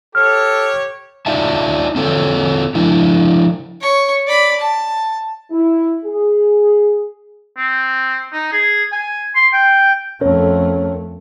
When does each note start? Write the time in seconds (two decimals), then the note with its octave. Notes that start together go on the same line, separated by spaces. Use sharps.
0.15 G4 A4 C#5 F6
1.26 D#4 F4 D5 E5 A5
1.96 C4 F4 A4 C#5
2.75 F3 D4 E4
3.81 C#5 C#6
4.26 D5 B5
4.60 A5
5.51 E4
6.05 G#4
7.57 C4
8.32 D#4
8.52 G#4
8.92 G#5
9.35 C6
9.53 G5
10.21 F2 A3 C#4 A#4 C#5